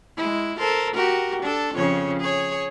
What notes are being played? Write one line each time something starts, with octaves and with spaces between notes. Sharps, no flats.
G#3 E4
A4 A#4 C5
F#4 G4 A#4
D4 A4
F2 C#3 C#5
G#4 C#5